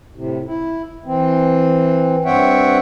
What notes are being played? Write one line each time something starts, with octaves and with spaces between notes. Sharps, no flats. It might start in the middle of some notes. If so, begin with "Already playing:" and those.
A2 C3
E4
E3 C4
G2 C4 C#5 E5 F#5 G5